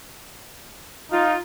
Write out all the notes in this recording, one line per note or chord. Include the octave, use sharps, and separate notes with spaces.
D#4 F4